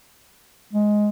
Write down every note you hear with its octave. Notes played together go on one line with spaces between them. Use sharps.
G#3